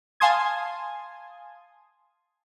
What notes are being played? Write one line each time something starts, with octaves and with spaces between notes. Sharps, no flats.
F5 G#5 A5 C6 D#6 G#6